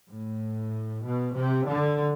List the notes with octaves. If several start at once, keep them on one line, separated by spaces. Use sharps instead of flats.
A2
B2
C3
D3